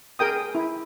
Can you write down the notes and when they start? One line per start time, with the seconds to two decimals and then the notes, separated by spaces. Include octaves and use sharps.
0.19 G#4 A#4 G5 D#6
0.55 E4